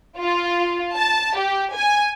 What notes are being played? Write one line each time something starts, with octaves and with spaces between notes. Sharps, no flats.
F4
A5
G4
G#5